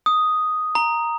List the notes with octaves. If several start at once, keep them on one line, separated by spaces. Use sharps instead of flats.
D#6
A#5